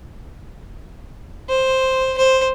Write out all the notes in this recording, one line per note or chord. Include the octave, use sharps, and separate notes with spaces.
C5
C5